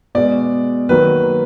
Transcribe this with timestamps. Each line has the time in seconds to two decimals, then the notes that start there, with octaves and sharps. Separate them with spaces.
0.15 B2 G#3 D5
0.89 D#3 F#3 A#3 B4